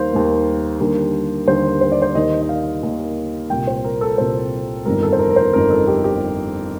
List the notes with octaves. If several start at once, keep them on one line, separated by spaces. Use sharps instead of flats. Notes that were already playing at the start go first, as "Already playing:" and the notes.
Already playing: D#2 D#3 G3 A#3 A#4 C5 F5
D#2 D#3 G3 A#3
D#2 D3 G3 A#3
D#2 D3 G3 A#3 C5
C5
D5
C5
D#2 D#3 A#3 D#5
D#5
F5
D#2 D#3 A#3
C2 A#2 G3 G5
C5
A#4
A4
C2 A#2 G3 C5
G1 F2 D#3 G3 A#4
A4
C5
A#4
A#4
C5
G1 F2 D#3 G3 A#4
A4
G4
G4